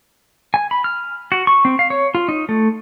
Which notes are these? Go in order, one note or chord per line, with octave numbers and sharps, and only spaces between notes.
G#5
B5
F6
F#4
C#6
C4
F5
C#5
F4
D#4
A3